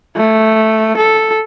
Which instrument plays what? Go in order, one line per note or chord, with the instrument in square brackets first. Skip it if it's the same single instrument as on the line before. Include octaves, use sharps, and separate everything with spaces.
[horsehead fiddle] A3
A4